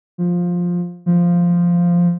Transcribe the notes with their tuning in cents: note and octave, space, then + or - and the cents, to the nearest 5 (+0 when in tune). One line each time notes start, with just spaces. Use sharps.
F3 +10
F3 -5